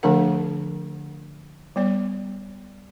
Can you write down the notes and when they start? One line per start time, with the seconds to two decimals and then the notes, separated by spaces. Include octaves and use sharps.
0.03 D3 F3 A3 D4 A#4 F#5
1.76 G3 B3 D5